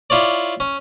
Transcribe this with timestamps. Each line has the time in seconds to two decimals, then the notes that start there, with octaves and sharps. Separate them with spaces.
0.10 E4 F4 C#5 D5
0.60 C#4